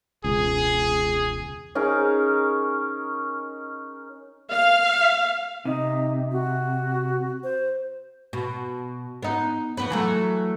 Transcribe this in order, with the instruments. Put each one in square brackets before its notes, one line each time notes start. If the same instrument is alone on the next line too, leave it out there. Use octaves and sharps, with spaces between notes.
[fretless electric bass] E1 C#2 [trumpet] G#4
[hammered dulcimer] C#4 D#4 G#4 A#4
[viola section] F5
[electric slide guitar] C3 [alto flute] D#4
[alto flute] F#4
C5
[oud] B2
B3 D#4
F2 B3 B4
E3 F#3 A3